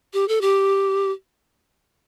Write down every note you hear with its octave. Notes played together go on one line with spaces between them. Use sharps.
G4
A4
G4